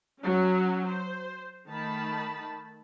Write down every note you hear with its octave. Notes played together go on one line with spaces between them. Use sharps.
F#3 C#4
C5
D#3 A3 A5 B5